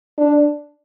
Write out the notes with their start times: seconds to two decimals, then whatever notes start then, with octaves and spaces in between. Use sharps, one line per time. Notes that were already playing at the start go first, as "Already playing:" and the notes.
0.18 D4